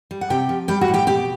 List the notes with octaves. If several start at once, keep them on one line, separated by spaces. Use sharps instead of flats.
G3
F#5
C3 G4 G5
F3
G3 G4 G5
F#4 F#5
A2
G4 G5
B2 G4 G5